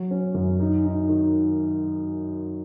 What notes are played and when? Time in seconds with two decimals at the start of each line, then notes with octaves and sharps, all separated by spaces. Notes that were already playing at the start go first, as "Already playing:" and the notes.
Already playing: F#3
0.11 C#4
0.34 F#2
0.60 D#4
0.85 D#4
1.09 D#3